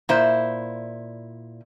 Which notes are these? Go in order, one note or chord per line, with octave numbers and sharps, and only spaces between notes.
A#2 E4 C5